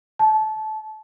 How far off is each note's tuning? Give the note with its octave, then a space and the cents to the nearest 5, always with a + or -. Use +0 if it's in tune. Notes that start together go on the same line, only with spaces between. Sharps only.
A5 -25